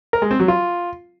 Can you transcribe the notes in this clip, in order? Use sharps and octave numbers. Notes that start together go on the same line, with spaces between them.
A#4
G#3
C4
F#3
F4